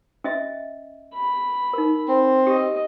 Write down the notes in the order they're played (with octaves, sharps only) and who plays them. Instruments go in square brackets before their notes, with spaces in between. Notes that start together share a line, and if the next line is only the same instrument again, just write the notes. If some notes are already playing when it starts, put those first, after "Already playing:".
[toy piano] C#4 D#5 E5
[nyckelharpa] B5
[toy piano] D#4 A#4
[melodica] C4
[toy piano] G4 [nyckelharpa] D#5